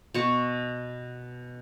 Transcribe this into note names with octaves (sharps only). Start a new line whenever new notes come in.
B2 C#6